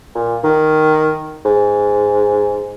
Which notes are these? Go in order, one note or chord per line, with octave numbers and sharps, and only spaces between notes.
A#2
D#3
G#2